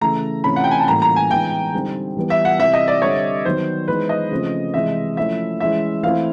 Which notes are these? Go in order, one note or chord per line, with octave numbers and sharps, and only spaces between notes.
C#3 E3 A3 A#5
C3 E3 A3 C#4 F4 B5
F#5
G5
G#5
A5
A2 E3 G3 A#3 C#4 A#5
A#5
G#5
E3 G#3 B3 D#4 G5
D3 G3 C4 D#4
E3 G3 B3
E5
F#5
C3 E3 G3 E5
D#5
D5
D3 G3 C4 C#5
D#3 F#3 B3 C5
E3 G#3 B3 D#4 B4
D#5
C#3 F3 A3 C4 F4
C3 E3 G#3 E5
F3 A3 C#4 E4 E5
E3 G#3 C#4 E4 E5
E3 A3 C4 E4 F5